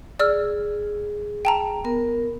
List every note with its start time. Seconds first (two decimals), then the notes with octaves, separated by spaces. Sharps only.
0.19 G#4 D5 E6 F6
1.45 G5 A5 A#5
1.84 B3 A#4